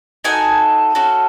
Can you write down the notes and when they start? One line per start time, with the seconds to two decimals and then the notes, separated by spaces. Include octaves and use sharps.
0.24 D#4 F#4 A4 G#5
0.95 C#4 F#4 A4